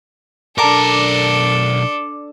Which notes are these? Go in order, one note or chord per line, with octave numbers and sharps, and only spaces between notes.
B1 D4 A4 A#4 D5 A5 A#5 D6